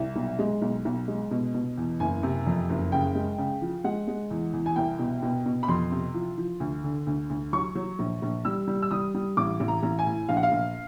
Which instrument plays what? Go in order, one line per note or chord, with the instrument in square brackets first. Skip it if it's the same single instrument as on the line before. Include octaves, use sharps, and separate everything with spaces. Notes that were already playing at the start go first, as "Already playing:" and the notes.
Already playing: [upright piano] C2
B1
G#3
B1
B1
G#3
B2
B2
E2
F#1 G#5
C3
F2
F#1
C#3 G5
G#3
C#3
F3
G#3 F#5
G#3
E2
E2
G#5
C2 G5
B2
B2
B2
B5
F2 C6
C3
F3
F3
D2
D3
D2
D2
F#3 C#6
F#3
A#1
A#1
G3 E6
G3
E6
G3 D#6
G3
A1 D6
A1
A#5
A1
G#5
A2
A#1 F5
F#5
F5
A#1